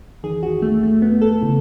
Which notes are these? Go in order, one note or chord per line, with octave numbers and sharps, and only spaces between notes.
E2 D#3 G#4
F#4
A3
A3
B3
A4
C#3 E3